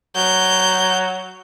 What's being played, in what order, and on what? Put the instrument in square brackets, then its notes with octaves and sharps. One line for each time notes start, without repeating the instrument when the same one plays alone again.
[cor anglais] F#3 [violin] G6